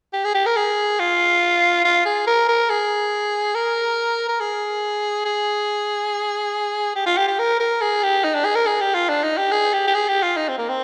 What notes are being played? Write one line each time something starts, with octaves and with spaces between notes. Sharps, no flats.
G4
G#4
G4
A#4
G#4
F4
F4
G#4
A#4
A#4
G#4
A#4
A#4
G#4
G#4
G4
F4
G4
G4
A#4
A#4
G#4
G4
D#4
D4
G#4
A#4
G#4
G4
F4
D4
D#4
G4
G#4
G4
G4
G#4
G4
F4
D#4
C4
A#3
C4